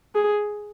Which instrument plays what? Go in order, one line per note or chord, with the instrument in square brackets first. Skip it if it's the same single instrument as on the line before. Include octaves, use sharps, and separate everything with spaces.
[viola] G#4